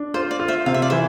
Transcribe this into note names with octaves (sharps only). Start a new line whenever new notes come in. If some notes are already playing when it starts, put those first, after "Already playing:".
Already playing: D4
F4 C5
D5
F4
C5 E5
C3 F5
E5
D5
E3 C5 E5